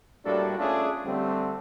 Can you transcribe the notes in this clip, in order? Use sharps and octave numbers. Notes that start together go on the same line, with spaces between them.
A2 G3 A#3 D4 F#4 A4
A3 C#4 D4 F4 G#4
D3 G3 A3 C4